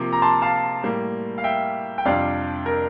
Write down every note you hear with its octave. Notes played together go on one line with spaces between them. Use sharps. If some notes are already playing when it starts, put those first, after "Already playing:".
Already playing: C3 F3 A#3 D6
A#5
A5 C6
F5 A5
A2 G3 A#3
F5
E5 G5
G5
F2 C3 G3 D4 D5 F5
A#4